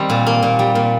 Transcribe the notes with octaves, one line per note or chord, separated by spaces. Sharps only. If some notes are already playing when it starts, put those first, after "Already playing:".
Already playing: D#3 G3 C4
A#2
A#3
A#2
G3
A#2